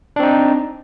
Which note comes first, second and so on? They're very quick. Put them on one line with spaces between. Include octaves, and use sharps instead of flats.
D4 C4 D#4